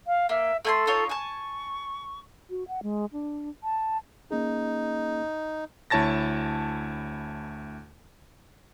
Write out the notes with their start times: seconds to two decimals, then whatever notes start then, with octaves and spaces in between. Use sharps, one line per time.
0.07 F5
0.29 A#3 E5
0.65 A3 A4 G#5 C6
0.87 D#4 F4 C#5
1.09 G#5 A5 C#6
2.50 F#4
2.68 F#5
2.83 G#3
3.13 D4
3.64 A5
4.31 A#3 C#4 D#4 G#4
5.90 D2 E4 C#5 A5 A6 A#6